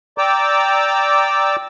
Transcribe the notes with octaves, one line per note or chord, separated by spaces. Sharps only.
D5 G5 A#5 D6 E6